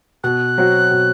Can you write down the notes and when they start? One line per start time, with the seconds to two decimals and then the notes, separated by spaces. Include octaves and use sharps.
0.24 B2 F#6
0.58 F#3 C4 F#4
0.91 B2